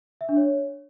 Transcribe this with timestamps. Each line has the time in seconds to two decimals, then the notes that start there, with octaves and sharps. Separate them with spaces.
0.21 E5
0.29 D4
0.37 C#5